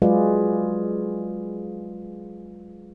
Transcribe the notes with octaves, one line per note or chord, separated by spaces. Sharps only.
F#3 G#3 F4 G#4 B4 D5